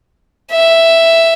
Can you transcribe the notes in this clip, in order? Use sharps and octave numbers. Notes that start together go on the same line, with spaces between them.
E5